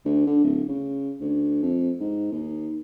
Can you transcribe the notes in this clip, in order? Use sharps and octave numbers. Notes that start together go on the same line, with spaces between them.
D2
D3
D1
C#3
D2
F2
G#2
D#2